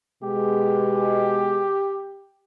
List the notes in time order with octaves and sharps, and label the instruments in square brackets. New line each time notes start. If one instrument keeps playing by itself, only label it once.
[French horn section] B2 G#3 [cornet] G4